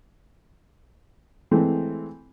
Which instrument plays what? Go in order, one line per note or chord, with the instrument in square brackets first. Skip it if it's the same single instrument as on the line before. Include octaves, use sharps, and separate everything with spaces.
[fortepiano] E3 G#3 A3 C4